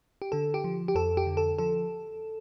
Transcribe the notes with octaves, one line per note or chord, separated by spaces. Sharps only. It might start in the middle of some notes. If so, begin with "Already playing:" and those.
G4
D3 A4
G4
F3
G4
F2 A4
G4
D3
A4
F3 A4